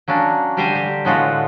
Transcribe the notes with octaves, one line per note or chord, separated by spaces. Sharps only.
F#3 A#3 C#4 D4
D3 G3 G4 C5 G#5 A#5
G4
A2 D3 G#3 B3 F4 F#4